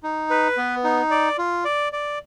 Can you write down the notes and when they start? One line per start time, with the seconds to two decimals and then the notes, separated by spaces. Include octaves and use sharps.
0.03 D#4
0.30 B4
0.57 B3
0.84 D#4
1.11 D5
1.38 F4
1.65 D5
1.93 D5